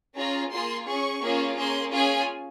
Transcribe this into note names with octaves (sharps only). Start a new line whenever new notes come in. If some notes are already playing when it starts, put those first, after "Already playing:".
C#4 F4 G#4 A#5
A#3 F4 G#4 C6
C#4 G#4 C#6
A#3 C#4 F4 G#4
A#3 C#4 G#4 C6
C#4 F4 G#4 G#5